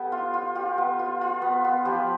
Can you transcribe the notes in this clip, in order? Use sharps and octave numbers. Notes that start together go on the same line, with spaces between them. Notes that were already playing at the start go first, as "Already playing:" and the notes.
Already playing: B3 G4 A4
F4
F4
F4 G4
B3
F4
F4
B3
B3
F3 G4